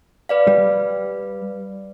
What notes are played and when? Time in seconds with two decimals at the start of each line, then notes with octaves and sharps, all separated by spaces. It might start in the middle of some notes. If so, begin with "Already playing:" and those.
0.29 B4 D5 F5
0.47 G3